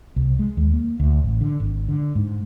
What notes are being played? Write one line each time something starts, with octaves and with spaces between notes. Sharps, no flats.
C2
G#3
D#2
A#3
D2
A1
D3
G#1
D3
G#2